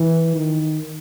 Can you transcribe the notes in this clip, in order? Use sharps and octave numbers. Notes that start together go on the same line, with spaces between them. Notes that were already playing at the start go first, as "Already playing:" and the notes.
Already playing: E3
D#3